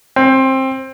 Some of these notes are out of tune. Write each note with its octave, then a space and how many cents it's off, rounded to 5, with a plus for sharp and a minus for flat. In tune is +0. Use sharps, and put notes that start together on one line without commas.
C4 +20